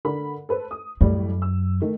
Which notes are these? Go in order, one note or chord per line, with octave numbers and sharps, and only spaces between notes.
D3 A#4 B5
A4 B4 C5
D#6
A1 F#2 A2 G3
E6
D#3 A3